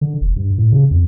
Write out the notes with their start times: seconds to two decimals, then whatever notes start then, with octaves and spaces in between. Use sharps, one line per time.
0.01 D3
0.21 E1
0.36 G2
0.58 A2
0.72 C#3
0.91 F2